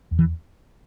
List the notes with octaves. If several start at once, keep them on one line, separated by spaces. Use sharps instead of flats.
E2
E3